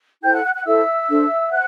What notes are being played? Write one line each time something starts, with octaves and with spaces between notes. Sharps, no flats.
E4 A4 C5 G5 G6
F#5 F#6
F#5 F#6
F#5 F#6
E4 A4 C5 E5 E6
D4 A4 C5
C5 F#5 F#6